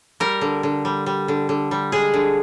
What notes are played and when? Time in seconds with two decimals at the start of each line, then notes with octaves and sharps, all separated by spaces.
0.20 G3 A#4
0.41 D3
0.63 D3
0.85 G3
1.06 G3
1.28 D3
1.49 D3
1.71 G3
1.92 G#3 G#4
2.14 D3